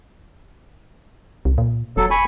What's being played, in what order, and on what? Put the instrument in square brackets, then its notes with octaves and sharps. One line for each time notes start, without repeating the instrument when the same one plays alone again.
[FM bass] C2
A#2
[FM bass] E1 [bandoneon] F#3 A4
[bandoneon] G#5 B5 C#6